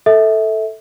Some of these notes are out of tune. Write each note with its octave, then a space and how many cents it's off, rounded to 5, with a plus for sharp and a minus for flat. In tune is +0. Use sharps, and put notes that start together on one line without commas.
A4 +0 E5 -25